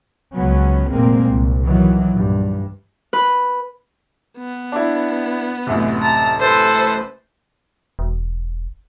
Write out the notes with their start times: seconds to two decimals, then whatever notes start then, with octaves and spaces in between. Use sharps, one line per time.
0.34 C#2 F3 F#3 B3 C#4
0.90 F1 A#2 G#3 A#3 C4
1.25 C2
1.64 D#3 E3 F#3
2.10 A#1 G2
3.13 B4
4.38 B3
4.72 D4 E4
5.67 A1 F#2 C3
6.02 A5 A#5
6.40 A4 B4 C5
7.99 E1